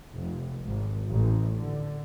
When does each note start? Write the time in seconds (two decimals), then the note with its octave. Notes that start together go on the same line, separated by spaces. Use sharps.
0.14 F1
0.66 G#1
1.08 A1
1.56 D3